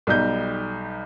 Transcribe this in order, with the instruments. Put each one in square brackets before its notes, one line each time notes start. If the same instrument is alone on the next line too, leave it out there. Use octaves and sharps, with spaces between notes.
[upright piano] B1 G3 D#4 G6